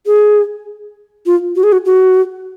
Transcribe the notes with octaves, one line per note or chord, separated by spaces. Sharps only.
G#4
F4
F#4
G#4
F#4
F#4